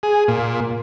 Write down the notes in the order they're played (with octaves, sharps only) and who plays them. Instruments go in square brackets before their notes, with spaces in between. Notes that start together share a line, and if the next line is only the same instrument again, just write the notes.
[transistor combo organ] G#4
A#2